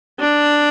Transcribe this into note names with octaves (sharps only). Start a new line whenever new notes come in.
D4